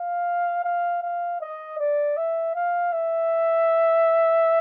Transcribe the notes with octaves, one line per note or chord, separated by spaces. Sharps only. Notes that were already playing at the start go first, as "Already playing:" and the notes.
Already playing: F5
F5
F5
D#5
D5
E5
F5
E5